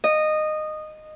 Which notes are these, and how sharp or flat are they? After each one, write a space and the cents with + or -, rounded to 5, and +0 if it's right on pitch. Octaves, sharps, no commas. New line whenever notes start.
D#5 -15